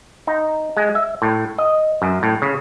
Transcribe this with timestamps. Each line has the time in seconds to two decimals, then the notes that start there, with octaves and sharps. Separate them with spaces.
0.27 D#4
0.77 G#3
0.95 E5
1.22 A2
1.58 D#5
2.02 F#2
2.23 A2
2.42 C#3